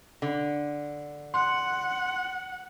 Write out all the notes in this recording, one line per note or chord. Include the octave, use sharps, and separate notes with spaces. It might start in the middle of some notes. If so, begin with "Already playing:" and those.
D3
F#5 C6